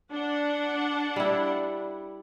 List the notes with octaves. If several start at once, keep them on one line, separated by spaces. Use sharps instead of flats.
D4 F#5
G3 E4